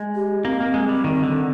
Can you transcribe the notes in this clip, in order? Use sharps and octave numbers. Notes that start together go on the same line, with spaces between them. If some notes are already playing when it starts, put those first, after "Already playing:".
Already playing: G#3
G4
A#3 C4
A#3
G#3
G3
D#3
D3